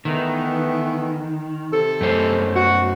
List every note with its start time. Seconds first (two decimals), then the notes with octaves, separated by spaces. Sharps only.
0.05 D#3 E3 A3 B3
1.73 C3 A4
2.01 F#2 A3 C5
2.55 F#4